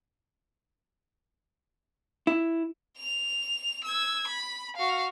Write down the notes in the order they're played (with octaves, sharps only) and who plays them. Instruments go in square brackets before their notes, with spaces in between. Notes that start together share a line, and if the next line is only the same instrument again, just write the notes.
[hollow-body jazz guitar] E4
[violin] F7
E6 G#6
B5
F#4 F5